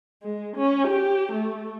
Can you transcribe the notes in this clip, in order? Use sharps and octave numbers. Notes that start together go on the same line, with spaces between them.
G#3
C#4
G4
A3